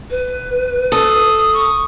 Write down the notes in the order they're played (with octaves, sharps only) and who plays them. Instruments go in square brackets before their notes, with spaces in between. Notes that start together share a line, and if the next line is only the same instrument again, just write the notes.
[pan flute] B4
[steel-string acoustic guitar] A4 [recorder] D#6
[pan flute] C#6